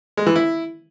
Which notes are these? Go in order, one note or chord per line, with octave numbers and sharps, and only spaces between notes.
G#3
E3
E4